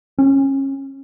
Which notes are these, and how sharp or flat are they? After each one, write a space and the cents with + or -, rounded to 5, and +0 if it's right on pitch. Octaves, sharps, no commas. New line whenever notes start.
C#4 -25